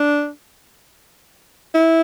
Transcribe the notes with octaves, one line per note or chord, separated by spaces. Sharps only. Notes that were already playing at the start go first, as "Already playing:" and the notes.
Already playing: D4
E4